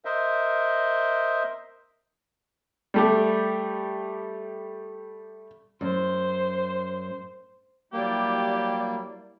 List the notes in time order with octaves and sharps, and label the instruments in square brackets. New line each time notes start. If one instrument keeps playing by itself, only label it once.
[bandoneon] A#4 C5 D#5 E5
[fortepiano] G3 A3 G4
[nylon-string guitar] F#2 [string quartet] C5
[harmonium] F#3 G3 [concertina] A#3 [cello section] E4 D5 [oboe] G4